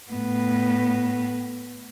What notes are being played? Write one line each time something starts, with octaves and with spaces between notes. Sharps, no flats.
A2 B3